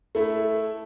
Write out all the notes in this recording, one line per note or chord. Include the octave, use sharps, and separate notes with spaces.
A3 E4